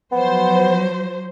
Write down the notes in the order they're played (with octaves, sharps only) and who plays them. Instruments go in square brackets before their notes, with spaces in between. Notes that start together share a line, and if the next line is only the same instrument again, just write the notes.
[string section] F3 F#3 C5 [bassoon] B3